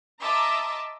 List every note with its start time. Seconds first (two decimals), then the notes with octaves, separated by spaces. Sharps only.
0.21 D#5 E5 A5 A#5 C6 D6